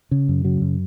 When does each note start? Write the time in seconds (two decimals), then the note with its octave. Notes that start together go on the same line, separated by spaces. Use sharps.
0.11 C#3
0.28 F#2
0.45 C#3 F#3
0.61 F#2